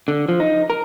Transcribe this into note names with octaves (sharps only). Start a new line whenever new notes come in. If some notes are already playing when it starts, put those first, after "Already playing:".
D3
F3
D#4
A#4